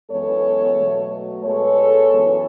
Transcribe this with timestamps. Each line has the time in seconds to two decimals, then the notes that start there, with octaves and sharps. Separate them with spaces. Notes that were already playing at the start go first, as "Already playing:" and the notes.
0.10 F#2 E3 G#3 B3 A4 C#5
0.76 B2 F#3 A3
1.44 B2 G#3 B3 A4 C#5
2.10 F#2 E3 B3